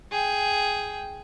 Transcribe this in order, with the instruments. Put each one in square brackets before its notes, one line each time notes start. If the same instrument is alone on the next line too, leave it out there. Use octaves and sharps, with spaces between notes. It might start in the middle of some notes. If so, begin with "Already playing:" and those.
[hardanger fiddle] G#4 G5